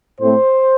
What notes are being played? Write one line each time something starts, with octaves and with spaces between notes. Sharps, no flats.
A2 A3 C4 C5